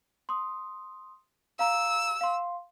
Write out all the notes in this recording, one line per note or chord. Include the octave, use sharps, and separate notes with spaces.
C6 D#6
F5 A#5 E6
F5 C6